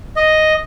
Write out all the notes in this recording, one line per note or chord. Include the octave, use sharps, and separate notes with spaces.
D#5